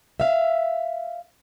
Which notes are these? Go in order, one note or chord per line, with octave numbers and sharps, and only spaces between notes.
E5 F5